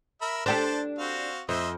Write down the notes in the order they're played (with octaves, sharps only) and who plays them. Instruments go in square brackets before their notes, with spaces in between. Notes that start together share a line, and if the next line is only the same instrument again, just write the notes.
[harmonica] A#4 E5 B5
[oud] D4 G4 A4 [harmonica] C5 D5 A5
[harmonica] C4 F#4 F5
[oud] F2 [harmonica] C4 D#5 E5